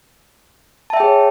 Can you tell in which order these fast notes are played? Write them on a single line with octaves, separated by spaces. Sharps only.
A5 E5 G5 G#4 C#5